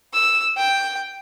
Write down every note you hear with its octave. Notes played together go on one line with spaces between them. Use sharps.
E6
G5